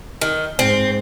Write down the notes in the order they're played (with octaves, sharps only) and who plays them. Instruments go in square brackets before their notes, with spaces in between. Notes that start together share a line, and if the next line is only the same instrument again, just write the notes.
[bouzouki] D#3
[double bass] G#2 [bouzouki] C4